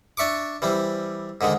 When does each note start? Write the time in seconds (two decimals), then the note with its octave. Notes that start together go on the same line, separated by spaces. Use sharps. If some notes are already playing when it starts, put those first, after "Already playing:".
0.17 D4 E5 C#6 D6
0.62 E3 G3 C4
1.41 G#2 D3 D#3 G#3